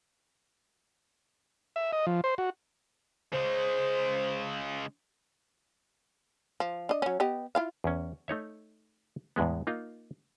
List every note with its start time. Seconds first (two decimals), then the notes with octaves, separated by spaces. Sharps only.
1.76 E5
1.93 D#5
2.06 F3
2.24 C5
2.38 F#4
3.33 C#3 G#3 C5
6.60 F3
6.89 D4 D#5
7.02 F#3 C#4
7.20 B3 G4 D#5
7.55 E4 F4 F5
7.84 E2 C#4
8.28 A3 D#4 C#5 E5
9.36 E2 A2 G#3 B3
9.67 A#3 D#4 F4